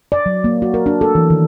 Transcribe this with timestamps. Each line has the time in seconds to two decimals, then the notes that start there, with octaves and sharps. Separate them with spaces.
0.12 D5
0.26 F#3
0.44 A#3
0.62 F#4
0.74 A#4
0.86 D4
1.01 A4
1.15 E3
1.30 D#3